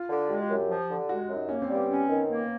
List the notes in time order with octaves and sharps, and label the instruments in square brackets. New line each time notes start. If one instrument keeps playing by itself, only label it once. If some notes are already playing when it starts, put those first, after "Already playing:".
Already playing: [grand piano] F4
[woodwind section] D3
[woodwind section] G#3 [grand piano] G4
[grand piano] G4
[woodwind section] F#2
[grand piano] G4
[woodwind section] F3
D3
[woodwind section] G#3 [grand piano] F#4
[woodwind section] F#2
[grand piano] D#4
[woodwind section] A#3 [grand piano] C#4
[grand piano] C4
[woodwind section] G3
[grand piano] B3
[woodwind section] C#4
D#3
A#3